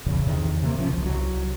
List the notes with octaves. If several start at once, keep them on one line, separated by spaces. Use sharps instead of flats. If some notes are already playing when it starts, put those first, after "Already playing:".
D1 A#1 E2 C#3
E2 C3 D#3
C3 A3 A#3
G1 C#3 F3 C#4
C#2 F3
C2 F#3